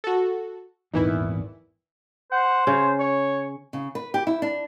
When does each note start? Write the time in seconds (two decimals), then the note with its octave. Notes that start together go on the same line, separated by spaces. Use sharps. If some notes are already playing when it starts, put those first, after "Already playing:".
0.04 F#4 A4
0.94 D#1 G#1 E2 D#3 E3 E4
2.32 C5 F#5
2.67 C#3 C#5
3.00 C#5 C#6
3.73 C#3
3.95 B4
4.14 G4
4.27 E4
4.42 D4